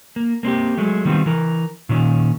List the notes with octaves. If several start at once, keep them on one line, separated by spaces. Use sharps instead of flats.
A#3
A#3 C4 D4 G4
F#3 G#3 A3
D#3 G3 B3 C4 F4
E3 A#4
A#2 D#3 C#4